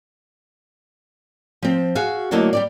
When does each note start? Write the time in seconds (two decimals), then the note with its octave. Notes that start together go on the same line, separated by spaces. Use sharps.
1.62 F3 C4
1.95 F#4 G#4 E5 F5
2.31 D2 F#3 A#3 E4 A4 D#5
2.53 G3 G4 D5